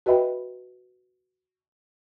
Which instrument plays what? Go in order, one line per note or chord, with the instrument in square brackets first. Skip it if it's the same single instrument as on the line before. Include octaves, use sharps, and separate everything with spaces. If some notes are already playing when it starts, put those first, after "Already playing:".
[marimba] F#4 B4 D#5 E5 G5 B5